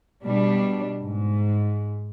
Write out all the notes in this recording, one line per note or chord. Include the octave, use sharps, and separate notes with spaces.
B2 G3 D4
G#2